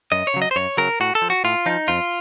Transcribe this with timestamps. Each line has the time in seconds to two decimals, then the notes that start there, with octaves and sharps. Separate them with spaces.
0.12 F#2 D#5
0.27 C#5
0.34 C#3 F#3
0.42 D#5
0.51 C5
0.56 F#2 C#5
0.77 C#3 F#3 A#4
1.00 A2 F#4
1.15 A4
1.22 F3
1.30 F#4
1.44 A2 F4
1.66 F3 D#4
1.88 F2 F4